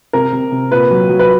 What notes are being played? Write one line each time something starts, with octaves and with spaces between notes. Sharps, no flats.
C3 A#4
C3
C3
A#2 B4
F#3
F#3
B4